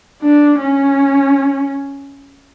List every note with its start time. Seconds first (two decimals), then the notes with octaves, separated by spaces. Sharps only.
0.23 D4
0.58 C#4